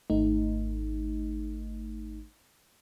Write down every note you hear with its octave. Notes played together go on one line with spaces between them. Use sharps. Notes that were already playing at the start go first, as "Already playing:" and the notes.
G#1 A3 D#4